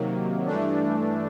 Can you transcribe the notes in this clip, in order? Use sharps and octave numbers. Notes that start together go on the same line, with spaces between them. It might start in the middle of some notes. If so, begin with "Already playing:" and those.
Already playing: C3 D#3 F#3 A#3
G2 E3 A3 D4